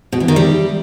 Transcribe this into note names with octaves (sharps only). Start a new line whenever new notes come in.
B2
E3
D#3
G3